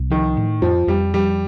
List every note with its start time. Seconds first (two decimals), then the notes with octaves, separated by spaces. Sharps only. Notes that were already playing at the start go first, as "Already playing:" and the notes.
Already playing: C2
0.10 D#3 F3
0.37 A2
0.62 F2 F3
0.87 F2 G3
1.14 F3 G3